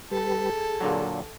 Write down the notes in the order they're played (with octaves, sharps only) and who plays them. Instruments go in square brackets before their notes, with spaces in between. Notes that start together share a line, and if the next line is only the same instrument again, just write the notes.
[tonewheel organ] G3 G4 B4 [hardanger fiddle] A4
[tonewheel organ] G#4
[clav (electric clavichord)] A#2 D3 F#3